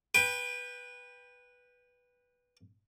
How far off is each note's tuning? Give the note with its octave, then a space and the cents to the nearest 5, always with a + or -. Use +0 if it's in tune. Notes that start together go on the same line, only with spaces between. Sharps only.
B4 -10 G5 +25